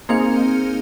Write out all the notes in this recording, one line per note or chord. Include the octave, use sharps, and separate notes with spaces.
A#3 C4 D#4 G#4 F5 C#7